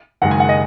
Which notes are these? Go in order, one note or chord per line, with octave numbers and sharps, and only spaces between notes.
F#1 F#2 D#3 G#3 F#5
G#5
F#5
D#5